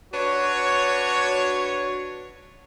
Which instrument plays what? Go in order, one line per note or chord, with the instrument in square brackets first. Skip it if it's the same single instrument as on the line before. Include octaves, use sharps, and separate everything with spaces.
[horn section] D4 F#4 B4 C#5